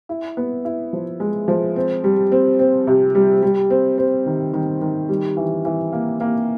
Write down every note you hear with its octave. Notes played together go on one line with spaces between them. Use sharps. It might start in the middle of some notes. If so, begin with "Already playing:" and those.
E4
B3
E4
F3
G#3
F3
C4
G3
C4
C4
C3
G3
G3
C4
C4
D#3
D#3
D#3
G3
E3
E3
A#3
A#3